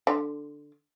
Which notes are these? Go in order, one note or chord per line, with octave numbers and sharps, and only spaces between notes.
D3